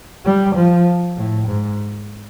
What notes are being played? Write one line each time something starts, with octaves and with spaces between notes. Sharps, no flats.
G3
F3
A2
G#2